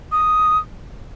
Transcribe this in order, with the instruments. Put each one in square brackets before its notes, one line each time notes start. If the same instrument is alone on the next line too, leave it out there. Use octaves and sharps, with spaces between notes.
[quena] D#6